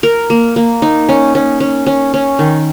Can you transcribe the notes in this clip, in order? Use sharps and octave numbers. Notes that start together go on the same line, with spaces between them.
A#4
A#3
A#3
D#4
C#4
C#4
C#4
C#4
C#4
D#3